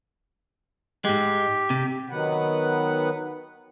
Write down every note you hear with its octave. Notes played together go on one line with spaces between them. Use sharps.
G#2 G#3 G4
C3
D#3 F#3 B3 B4 F#5